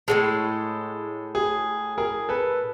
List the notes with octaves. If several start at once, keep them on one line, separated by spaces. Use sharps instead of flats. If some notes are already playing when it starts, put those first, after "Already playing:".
A2 E3 G#3 A4
G#4
G#4 A#4
A4 B4